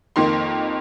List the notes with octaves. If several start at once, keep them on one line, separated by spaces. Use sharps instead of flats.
F2 D#3 A#3 C6